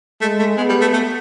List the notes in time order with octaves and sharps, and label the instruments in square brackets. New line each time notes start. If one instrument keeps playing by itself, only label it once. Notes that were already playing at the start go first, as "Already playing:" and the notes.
[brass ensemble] G#3 [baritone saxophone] A3
[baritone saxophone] A3
[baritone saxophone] G#3 [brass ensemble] B3
[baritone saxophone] G3
A3
A3